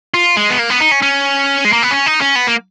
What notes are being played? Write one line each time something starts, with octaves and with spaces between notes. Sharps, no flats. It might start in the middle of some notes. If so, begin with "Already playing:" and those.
F4
G#3
B3
A#3
B3
D#4
C#4
C#4
G#3
A#3
B3
C#4
D#4
C#4
B3
A#3